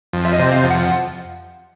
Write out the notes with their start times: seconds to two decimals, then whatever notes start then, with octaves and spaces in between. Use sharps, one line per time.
0.13 F2
0.25 E5
0.32 D#5
0.39 C3
0.51 F5
0.64 F2
0.70 F#5